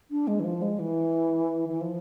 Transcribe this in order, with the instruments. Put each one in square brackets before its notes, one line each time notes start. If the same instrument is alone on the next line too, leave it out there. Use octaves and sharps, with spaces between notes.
[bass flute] D4
G#3
E3
F3
G#3
E3
E3
F3